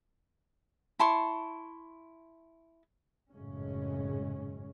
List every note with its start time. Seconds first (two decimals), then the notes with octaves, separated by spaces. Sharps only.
0.99 E4 A5 C6 C#6
3.32 G#1 F#2 A2 C#3 G#3 C#4